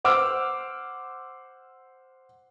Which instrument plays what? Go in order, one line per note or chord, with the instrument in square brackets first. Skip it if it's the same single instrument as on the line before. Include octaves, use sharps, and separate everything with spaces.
[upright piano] C5 F#5 D6 E6 F6